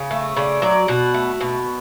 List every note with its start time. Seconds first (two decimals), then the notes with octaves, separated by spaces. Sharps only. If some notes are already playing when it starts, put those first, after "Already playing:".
Already playing: C#3
0.11 A3
0.36 C#3 D5
0.62 F#3 D5
0.88 B2 F#4
1.14 A3
1.41 B2